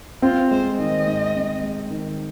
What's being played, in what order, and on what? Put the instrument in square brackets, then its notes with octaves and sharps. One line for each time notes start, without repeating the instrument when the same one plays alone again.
[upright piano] C4 [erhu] F4
[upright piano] G#3 [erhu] C5
[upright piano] D#3 [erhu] D#5
[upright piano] G#2
C4
G#3
D#3